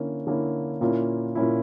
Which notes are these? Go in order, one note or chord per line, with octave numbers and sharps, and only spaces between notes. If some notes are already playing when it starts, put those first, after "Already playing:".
Already playing: D3 A#3 C#4 E4
D3 A#3 C#4 E4
A#2 A#3 C#4 E4
A#2 A#3 C#4 E4